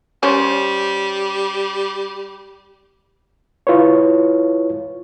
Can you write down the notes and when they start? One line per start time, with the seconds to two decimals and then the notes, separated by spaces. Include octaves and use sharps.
0.23 G3 C#4 C5
3.67 E4 F4 B4 C#5